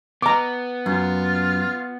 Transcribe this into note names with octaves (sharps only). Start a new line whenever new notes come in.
B3 A#5 D6
F#2 F4